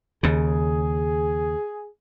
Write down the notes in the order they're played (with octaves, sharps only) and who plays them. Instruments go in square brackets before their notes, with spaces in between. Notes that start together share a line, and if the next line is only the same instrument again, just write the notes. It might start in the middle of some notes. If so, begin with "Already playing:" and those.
[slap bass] D#2 C#3 [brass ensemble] G#4